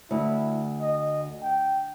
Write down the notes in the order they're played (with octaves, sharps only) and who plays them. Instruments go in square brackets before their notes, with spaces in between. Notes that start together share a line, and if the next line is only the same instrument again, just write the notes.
[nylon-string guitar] D2 [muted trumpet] E4
[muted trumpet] D#5
G5